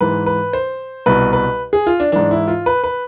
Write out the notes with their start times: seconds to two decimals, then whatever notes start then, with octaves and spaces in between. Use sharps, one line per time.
0.01 G#2 E3 B4
0.26 B4
0.53 C5
1.06 C2 B2 B4
1.33 B4
1.73 G#4
1.87 F4
2.00 D4
2.12 G#2 E3 D4
2.31 E4
2.48 F4
2.66 B4
2.84 B4